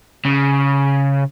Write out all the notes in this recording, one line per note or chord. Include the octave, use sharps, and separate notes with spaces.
C#3